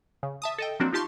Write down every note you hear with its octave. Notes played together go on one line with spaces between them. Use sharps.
C#3
E5 A5 D#6
A4 D#5 G5
F3 F#3 A#3 C4 D4 F#4
D#4 F4 G4 A5 C6 C#6